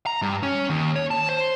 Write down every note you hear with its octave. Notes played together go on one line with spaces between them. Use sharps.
A#5
G2
C#4
D#2
C#5
A5
C5